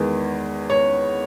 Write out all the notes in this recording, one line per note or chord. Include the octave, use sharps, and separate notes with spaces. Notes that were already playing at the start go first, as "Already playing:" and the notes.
Already playing: E2 D#3 G#3 B3
C#5